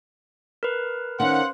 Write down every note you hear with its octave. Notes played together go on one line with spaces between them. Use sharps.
A#4 B4
D#3 C#4 C5 F5 F#5 C6